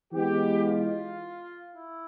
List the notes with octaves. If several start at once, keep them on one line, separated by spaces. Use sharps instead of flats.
E3 G#3 B3 G4
F4
E4